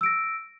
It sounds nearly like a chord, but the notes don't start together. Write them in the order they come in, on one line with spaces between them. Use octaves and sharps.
E6 D7 A#6